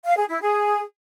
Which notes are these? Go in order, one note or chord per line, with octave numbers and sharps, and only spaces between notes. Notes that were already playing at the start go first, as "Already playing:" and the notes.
F5
G#4
E4
G#4